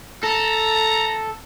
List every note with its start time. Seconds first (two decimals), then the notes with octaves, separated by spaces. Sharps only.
0.24 A4 A#5